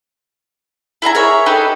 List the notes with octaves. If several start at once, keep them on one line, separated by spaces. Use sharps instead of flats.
E4 G#4 E5 A#5
G#4 A#4 C#5 E5
D#4 G4 A4 B4